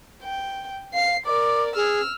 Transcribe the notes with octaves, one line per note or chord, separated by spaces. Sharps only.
G5
F5 C7
A#4 D5 D6
G#4 E6 F6